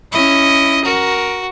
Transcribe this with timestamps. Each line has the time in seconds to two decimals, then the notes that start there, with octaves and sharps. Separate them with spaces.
0.12 C#4 E4 D#5
0.84 F#4 A#4